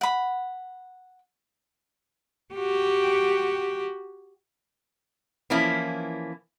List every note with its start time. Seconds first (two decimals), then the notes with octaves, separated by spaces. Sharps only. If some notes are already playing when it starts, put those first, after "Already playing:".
0.01 F#5 B5
2.54 F#4 G4
5.50 E3 F3 A#3 C#4 E4